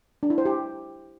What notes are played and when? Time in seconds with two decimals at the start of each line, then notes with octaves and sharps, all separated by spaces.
0.23 D4
0.30 E4
0.38 C5
0.45 G4